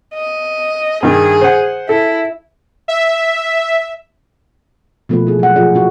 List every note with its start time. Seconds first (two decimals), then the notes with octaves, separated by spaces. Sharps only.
0.14 D#5
1.03 G2 D#3 G#4
1.41 C5 F#5
1.89 E4 A4
2.88 E5
5.09 B2 F3 A3 A#3 F4 B4
5.27 E4 G#4
5.39 F#3 F#5
5.56 A#2 F3 F4 G4 G#4 D5
5.75 E4 F#4 G4